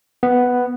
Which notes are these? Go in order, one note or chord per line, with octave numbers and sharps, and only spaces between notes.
B3